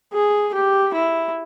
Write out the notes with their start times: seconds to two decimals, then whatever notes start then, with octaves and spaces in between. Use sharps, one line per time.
0.13 G#4
0.54 G4
0.94 E4